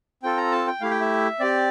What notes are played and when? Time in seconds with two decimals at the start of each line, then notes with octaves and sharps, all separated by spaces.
0.23 C4 F4 A4 G5
0.37 A#5
0.52 A5
0.67 G5
0.81 A3 E4 G4 F5
0.90 G5
1.01 E5
1.40 C4 G4 D5